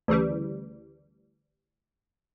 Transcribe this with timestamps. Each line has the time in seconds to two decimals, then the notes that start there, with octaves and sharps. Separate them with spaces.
0.08 D2 C#3 E3 G3